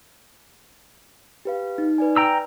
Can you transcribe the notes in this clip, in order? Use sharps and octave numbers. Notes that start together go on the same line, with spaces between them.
G4 B4 F5
D#4
B4 D5 G#5
G5 A#5 E6